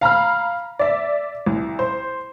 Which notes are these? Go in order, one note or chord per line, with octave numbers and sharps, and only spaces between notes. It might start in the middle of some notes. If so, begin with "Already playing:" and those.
F5 A#5 B5 F6
D5 E5
C2
C5